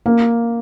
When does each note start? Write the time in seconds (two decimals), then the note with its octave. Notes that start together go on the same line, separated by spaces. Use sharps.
0.06 A#3